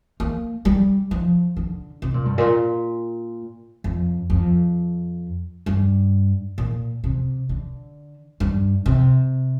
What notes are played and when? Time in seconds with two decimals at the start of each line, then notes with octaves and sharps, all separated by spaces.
0.20 A#3
0.65 G3
1.11 F3
1.57 D3
2.02 C3
2.14 A#2
2.25 G2
2.38 A#2
3.84 F2
4.30 F2
5.66 G2
6.58 A#2
7.04 C3
7.49 D3
8.40 G2
8.86 C3